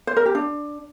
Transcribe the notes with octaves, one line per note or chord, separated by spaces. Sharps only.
C5
A#4
G4
D4